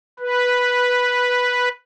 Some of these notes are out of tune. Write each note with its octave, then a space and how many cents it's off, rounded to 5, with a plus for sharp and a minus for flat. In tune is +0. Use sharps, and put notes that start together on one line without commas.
B4 -5